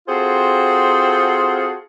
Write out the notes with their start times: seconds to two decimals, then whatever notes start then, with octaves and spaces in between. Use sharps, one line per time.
0.08 C4 F4 F#4 G#4 A4 C5